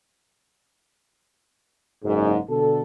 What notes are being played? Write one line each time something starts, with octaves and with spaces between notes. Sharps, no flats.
F#1 G#2
B2 D3 A4